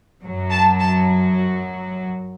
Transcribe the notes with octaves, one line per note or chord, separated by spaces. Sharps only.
F#2 F#3
A5
A5